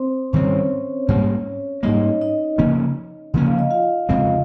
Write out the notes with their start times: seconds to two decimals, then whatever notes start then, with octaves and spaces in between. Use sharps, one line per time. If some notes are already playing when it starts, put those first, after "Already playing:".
Already playing: C4 C5
0.33 G#2 D#3 G3 C4 C#4 C#5
1.08 G#2 G3 A#3
1.83 G#2 G3 A#3 D#4 D#5
2.22 D#4 D#5
2.58 C#3 F3 A#3 C#4
3.34 C#3 F3 A#3 C#4
3.47 F5
3.59 D#5
3.71 F4 F5
4.09 F2 C#3 G#3 C4